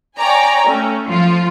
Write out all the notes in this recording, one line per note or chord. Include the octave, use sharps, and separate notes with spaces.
C#5 D5 G5 G#5 A#5
A3 C#4
F3 F4